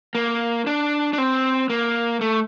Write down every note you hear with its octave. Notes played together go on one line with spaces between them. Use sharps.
A#3
D4
D4
C4
A#3
A3